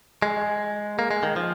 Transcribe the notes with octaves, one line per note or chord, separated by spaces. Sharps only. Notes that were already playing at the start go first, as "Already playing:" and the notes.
G#3
A#3
G#3
D#3
F3